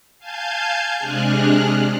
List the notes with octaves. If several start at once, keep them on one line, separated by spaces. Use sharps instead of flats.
F5 G#5 A5 G6 G#6
C3 G#3 D4 G#4 F6 F#6